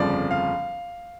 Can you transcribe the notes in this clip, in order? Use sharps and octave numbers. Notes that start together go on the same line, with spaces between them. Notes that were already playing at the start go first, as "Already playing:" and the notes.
Already playing: G1 F2 C#3 F3 D5
F5